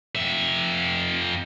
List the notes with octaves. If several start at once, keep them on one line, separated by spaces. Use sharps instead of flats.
F2 E5